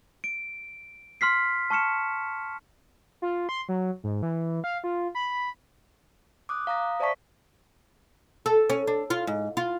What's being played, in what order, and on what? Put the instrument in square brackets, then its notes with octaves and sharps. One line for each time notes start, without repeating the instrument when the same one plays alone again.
[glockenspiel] D7
C6 F6 B6 C7
A5 C#6 F6 C#7 E7
[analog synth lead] F4
C6
F#3
G#2
E3
F5
F4
B5
[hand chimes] D6 D#6 F#6
F5 A#5 D#6 A#6
C5 D5 E5 A5 C#6 B6
[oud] A4
C#4
D4
F4
G#2
F4